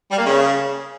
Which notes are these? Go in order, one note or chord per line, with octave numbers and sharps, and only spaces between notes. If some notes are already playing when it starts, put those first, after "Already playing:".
G3
A#3
C#3